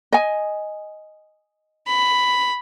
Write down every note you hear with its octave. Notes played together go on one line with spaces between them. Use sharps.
D#5 G#5
B5